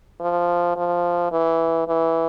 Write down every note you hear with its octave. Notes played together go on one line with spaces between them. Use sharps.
F3
F3
E3
E3